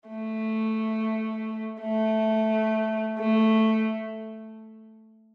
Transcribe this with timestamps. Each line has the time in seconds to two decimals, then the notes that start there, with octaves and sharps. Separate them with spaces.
0.09 A3
1.81 A3
3.18 A3